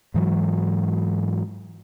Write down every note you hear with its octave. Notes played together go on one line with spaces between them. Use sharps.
G#2 E3 F#3